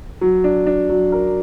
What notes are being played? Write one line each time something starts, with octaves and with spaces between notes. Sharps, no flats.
F#3
D4
D4
F#3
A#4